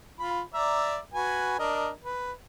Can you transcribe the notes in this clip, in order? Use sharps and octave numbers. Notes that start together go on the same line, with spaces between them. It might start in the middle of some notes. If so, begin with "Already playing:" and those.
F4 B5
D5 E5 A#5
F#4 B4 G#5
D4 A#4 D#5
B4